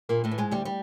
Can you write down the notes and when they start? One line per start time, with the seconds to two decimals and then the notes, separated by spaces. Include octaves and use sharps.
0.09 G2 A#2 A#3
0.24 A2 A3
0.31 E3
0.38 G#2 G#3
0.51 D2 G3
0.65 G3